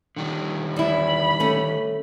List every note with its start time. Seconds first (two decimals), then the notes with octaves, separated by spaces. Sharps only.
0.16 D3 D#3 G3
0.76 E2 E4 B5
1.40 A3 C#4